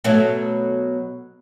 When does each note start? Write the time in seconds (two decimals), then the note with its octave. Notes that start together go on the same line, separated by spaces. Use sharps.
0.04 B2 F#3 A3